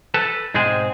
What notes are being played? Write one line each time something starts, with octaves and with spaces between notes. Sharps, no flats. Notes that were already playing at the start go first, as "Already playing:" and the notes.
A4 B4 A5
G#2 B2 G#3 C4 G#4 C5